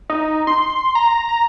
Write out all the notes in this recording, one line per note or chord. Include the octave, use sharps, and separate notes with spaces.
D#4
C6
A#5
A#5